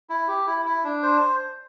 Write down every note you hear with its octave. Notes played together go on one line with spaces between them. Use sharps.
E4
G4
E4
E4
D4
C5